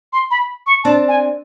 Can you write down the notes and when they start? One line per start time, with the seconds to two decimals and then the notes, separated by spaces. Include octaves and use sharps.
0.13 C6
0.31 B5
0.66 C#6
0.84 C4 D4 A5
1.08 G#5